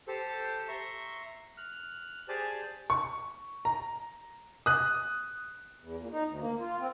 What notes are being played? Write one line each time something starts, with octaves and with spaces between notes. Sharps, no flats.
G4 A4 C5
E5 A#5 C6 C#6
F6 F#6
G4 G#4 C5 D5 G#5 A5
C#6
A#5
D#6 F#6
E2
A#2
D#4
D2
A#3
F4
C4